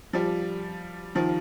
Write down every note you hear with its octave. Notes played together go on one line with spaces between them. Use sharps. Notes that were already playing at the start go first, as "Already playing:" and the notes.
F3 G3
D#3 F3